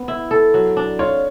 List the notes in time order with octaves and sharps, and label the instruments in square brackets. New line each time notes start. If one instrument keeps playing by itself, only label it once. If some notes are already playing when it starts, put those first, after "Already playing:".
Already playing: [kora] B3
E4
A4
F#3
D4
[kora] F4 [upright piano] C#5